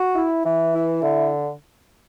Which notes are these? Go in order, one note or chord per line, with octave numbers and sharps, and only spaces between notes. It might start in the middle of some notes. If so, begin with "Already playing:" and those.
Already playing: F#4
E4
E3
E4
D3